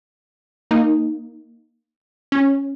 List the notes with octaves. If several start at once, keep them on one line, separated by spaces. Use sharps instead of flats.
A#3 D#4
C#4